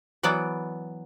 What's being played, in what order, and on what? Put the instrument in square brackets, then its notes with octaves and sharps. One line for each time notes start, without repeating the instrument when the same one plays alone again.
[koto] E3 F#3 B3 D5